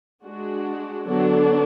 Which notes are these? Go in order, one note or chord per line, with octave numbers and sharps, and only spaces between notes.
G#3 D4 F#4
D3 F#3 B3 D4 F#4